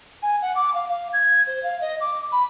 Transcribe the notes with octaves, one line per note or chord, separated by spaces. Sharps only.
G#5
F#5
D6
F5
F5
G#6
C5
F5
D#5
D6
B5